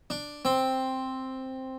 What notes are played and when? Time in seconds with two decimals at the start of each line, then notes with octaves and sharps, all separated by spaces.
0.10 D4
0.45 C4